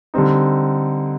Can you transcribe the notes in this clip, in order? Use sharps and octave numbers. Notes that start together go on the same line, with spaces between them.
D3 G3 C4 D#4